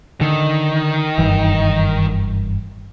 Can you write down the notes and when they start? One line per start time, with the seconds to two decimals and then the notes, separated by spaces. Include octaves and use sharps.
0.21 D3 D#3
1.18 F#1 G2 E3